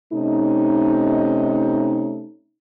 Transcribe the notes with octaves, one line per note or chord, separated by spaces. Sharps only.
C3 A3 C#4 D#4